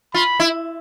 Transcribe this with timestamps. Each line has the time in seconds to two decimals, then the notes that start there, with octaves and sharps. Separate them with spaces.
0.14 F4 B5
0.40 E4